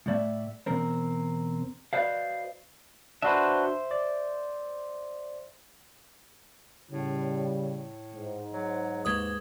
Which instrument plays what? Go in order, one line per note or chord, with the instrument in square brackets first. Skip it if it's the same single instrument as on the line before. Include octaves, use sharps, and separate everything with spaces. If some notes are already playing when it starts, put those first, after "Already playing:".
[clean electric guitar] A2 A3 D5 E5
E2 B2 C4 A#4 C5
F#4 B4 C5 D5 D#5 F5
[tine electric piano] D4 F#4 B4 [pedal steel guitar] C5 E5
[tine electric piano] D5
[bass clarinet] A2 [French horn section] C#3 G3
[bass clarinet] A2
[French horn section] G#2
[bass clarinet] F#3
[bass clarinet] D#2 [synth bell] G#3 B4 D#6